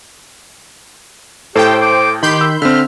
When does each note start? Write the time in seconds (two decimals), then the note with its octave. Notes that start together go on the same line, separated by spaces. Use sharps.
1.55 A2 G4 A4 C5 G5
1.81 D6
2.23 D#3 G4 B5 C6 G6
2.41 E6
2.62 D3 C4 E5 F6